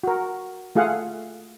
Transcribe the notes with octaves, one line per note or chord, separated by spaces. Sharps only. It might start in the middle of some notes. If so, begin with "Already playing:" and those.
F#4 A#4
A3 F4 G#4 F5 F#5